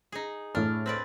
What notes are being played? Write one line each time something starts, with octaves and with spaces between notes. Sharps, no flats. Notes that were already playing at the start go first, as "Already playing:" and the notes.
D#4 G#4
A2 D4 F6
C4 B4 D5